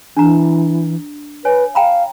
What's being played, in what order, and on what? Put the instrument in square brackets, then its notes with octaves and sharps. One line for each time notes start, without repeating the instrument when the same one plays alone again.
[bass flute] E3 [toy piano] D4 A#5
[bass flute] B4 [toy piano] C#5 G#5
[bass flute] F5 [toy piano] G5 A#5 B5